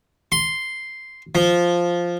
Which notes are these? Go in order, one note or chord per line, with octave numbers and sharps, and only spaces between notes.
C6
F3